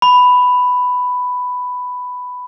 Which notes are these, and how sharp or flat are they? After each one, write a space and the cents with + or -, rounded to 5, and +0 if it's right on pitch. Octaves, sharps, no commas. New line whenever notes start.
B5 +10